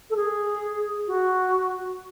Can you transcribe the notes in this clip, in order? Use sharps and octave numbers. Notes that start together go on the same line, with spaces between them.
A4
G#4
F#4